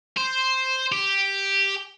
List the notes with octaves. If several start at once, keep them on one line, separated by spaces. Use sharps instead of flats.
C5
G4